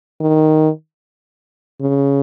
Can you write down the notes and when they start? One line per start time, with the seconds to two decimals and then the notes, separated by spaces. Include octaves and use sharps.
0.21 D#3
1.81 C#3